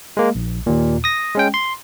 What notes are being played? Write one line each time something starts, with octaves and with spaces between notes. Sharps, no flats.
G#3 A#3
A#1
D#2 A#2
D#6 A#6
G#3 C#4 G5
C6